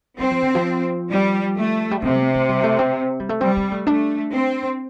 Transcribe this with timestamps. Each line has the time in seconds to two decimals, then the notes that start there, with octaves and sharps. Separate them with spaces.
0.18 G3 C4
0.31 F3
0.43 D3
0.55 F3
1.10 G3
1.57 A3
1.91 G3
2.02 C3 F3
2.21 C4
2.34 A3
2.49 G3
2.64 A3
2.79 C4
3.20 G3
3.29 A3
3.40 G3 C4
3.56 C4
3.72 A3
3.87 A3 D4
4.33 C4